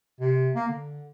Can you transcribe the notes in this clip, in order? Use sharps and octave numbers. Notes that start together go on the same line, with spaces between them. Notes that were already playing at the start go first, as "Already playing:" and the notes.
C3
A#3
D3